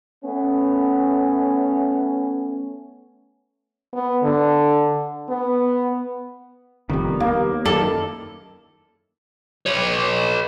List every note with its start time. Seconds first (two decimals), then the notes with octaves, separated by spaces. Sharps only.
0.24 A3 B3 C#4
3.93 B3
4.23 D3
5.29 B3
6.90 F1 F2 D#3 G3 B3
7.20 D#2 A#3
7.66 F#2 D#3 E4 F4 A4 D5
9.66 B4 C#5